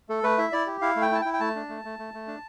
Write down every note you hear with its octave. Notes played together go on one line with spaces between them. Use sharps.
A3 A4
A3 B4
E4 E5
E4 D5
G4
E4 F5
A3
G5
E4 A5
G5
E4
G5
A3 A5
D4
A3
A3
A3
A3
D4